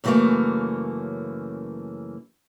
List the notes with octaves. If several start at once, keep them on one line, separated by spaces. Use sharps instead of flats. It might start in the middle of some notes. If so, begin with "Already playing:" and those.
F#2 C#3 E3 F#3 A3 A#3